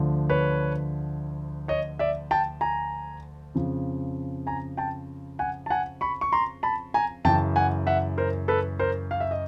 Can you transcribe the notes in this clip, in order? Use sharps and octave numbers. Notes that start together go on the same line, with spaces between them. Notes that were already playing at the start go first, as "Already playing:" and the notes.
Already playing: D2 D3 F3
B4 C#5
C#5 D#5
D5 E5
G5 A5
G#5 A#5
F2 C#3 F3
G#5 A#5
G5 A5
F#5 G#5
A5
F#5 G#5
B5 C#6
C#6
A#5 C6
A5 B5
G#5 A#5
F#2 C#3 E3 G5 A5
F#5 G#5
E5 F#5
A#4 C5
A4 B4
A#4 C5
F5
E5
D#5